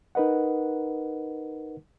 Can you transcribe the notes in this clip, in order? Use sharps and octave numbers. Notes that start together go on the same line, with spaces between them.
D#4 A#4 B4 D#5 F#5